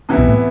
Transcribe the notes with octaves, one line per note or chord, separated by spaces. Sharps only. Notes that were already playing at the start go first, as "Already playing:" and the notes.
C3 E3 B3 E4
B1 B2
A2